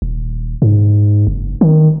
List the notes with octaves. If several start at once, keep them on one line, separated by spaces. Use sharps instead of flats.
D#1
G#2
F#1
D#3